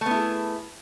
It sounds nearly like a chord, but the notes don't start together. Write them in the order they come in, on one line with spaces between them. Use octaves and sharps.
A3 B3 E4 G#4